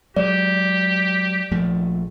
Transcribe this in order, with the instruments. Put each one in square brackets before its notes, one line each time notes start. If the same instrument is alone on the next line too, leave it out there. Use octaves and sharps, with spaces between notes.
[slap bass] F#3 G#3 [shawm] G4 [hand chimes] D5
[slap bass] A#1 F3 A3